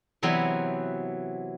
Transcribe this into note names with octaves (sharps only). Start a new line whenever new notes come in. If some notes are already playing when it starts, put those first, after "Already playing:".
C3 E3 F#3 B3 C4